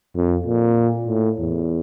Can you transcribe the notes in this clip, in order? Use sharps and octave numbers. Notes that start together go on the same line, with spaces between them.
F2
A#2
A2
E2